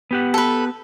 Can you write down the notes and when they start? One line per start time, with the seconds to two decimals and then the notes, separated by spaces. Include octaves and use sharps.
0.11 B3 G4 F#5
0.34 A4 B4